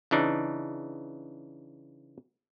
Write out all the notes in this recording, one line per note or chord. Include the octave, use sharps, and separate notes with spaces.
C#3 E3 D4 D#4